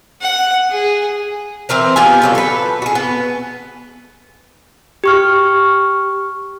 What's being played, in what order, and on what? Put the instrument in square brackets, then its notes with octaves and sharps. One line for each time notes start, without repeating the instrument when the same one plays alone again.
[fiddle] F#5
G#4
[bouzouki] E3 C4 A#4 C5
B3 F4 G4 G#5
D3 F#3 C4
A4 B4
F#4 G#4
B3
[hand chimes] G4 C#6 F6